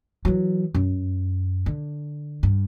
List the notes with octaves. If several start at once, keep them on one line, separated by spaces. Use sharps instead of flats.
E3 F#3
F#2
D3
G2